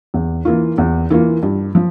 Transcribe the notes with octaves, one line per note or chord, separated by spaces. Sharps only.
E2
E3 A#3 F4
E2
E3 A#3 F4
G2
F3